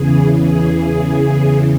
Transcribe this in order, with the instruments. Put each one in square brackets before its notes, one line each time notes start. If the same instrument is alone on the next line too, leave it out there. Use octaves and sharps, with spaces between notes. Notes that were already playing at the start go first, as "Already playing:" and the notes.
Already playing: [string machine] E2 C#3 E3 G#4
G#4